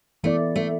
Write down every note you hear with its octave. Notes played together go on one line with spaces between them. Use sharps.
E3 A3 B3 E4 D5
A3